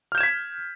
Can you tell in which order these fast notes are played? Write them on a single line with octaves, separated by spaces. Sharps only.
F6 G6 E7 G#6 B6